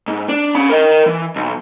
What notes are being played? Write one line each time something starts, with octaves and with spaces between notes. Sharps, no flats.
G#2
D4
C#4 B5
A#4 D#5
E3
B1